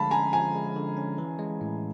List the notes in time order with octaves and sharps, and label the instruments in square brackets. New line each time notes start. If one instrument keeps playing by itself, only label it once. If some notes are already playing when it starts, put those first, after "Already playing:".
Already playing: [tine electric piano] D3 F3 G#3 [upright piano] F5 A5 B5
[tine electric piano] C#4 [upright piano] G#5 A#5
[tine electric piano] F3 [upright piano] G#5 A#5
[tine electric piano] G#3
D3
C#4
E3
G#3
A2